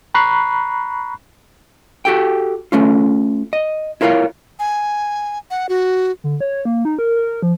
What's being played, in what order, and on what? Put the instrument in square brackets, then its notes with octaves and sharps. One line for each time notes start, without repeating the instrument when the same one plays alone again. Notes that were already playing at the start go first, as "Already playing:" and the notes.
[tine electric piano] A#5 B5 C#6 F#6 C7
[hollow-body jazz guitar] F#4 G4 A4 G5
A3 C#4 F4
D#5
E4 F4 A#4 C#5 F5
[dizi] G#5
F#5
F#4
[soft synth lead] D3
C#5
A#3
D#4
A#4
A#4
F3